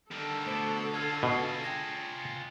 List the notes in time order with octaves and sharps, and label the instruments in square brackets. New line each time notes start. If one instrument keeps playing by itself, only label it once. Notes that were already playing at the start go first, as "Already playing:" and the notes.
[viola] D3 A4 [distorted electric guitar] D#3 G3
[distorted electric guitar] B2 [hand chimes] A3 C5 D7
[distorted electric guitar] F4 G#4 [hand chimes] F6 G#6
[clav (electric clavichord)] B2
[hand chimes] G5 G#6 A#6